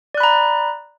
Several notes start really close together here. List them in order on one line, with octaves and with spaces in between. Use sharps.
D5 F#6 B5 A#5